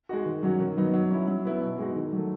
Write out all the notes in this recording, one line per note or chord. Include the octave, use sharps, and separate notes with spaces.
G#3 D#4 F#4
D#3
F#3 C#4 F#4
D#3
F#3 B3 D#4
F#3
C#4 E4
F#3
B3 E4
B2
G#3 D#4 F#4
D#3
F#3 A3